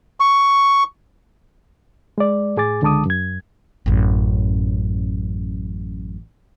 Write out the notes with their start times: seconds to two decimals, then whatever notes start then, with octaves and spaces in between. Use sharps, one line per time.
0.20 C#6
2.18 G#3 D5
2.57 A2 G#4 G#5 D6 A6
2.82 C#2 D3 G#3 A5 D6 D#6
3.06 F#2 G#6
3.86 A1 F#2